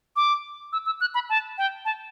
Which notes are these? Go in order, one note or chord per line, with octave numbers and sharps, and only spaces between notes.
D6
E6
E6
F#6
B5
A5
G5
A5